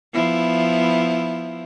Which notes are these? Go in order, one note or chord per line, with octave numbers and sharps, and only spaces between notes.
F3 B3 E4